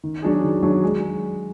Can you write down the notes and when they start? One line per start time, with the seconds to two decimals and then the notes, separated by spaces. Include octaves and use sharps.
0.04 D#3
0.22 F#3 D4 G#4
0.43 D#3
0.63 F#3 D4 G#4
0.83 G#3